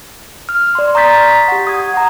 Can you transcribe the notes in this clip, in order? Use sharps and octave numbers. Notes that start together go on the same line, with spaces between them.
F6
D5 C6
A#5 C#6 D#6 G6 A6 B6
G4 F#5
D#6 G#6
F#5 A#5